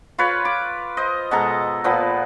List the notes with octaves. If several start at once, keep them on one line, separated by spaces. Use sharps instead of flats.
F4 B4 C#5
D6
C5 D#5
B2 G#3 A4 A#5
A#2 F3 B3